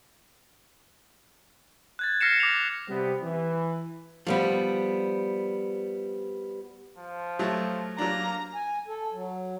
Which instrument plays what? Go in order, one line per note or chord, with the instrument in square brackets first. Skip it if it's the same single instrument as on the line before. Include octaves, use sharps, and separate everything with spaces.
[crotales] F#6 G#6 A6
F6 A#6 C7 C#7 E7
D6 F7
[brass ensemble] C3 G3 B3 G4
E3
[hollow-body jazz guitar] F3 G3 B3
[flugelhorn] F3
[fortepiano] F#3 A3
[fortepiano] F#3 D4 [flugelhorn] A#3 [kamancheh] A#5
[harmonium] G#5
A4
F#3